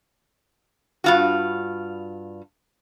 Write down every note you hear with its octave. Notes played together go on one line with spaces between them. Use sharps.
G2 F4 F#4